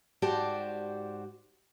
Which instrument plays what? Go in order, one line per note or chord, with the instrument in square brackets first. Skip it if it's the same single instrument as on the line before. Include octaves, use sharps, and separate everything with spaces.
[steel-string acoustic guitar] G#2 F#4 G4 C5 D5 A5